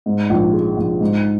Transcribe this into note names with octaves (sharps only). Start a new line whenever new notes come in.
G#2
A#1
G#3
A#1
G#2